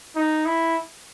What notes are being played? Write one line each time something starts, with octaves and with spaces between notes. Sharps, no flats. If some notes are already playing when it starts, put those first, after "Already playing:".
D#4
E4